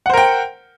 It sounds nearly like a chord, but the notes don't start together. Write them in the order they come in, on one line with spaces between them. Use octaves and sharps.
F#5 C5 A#4 G5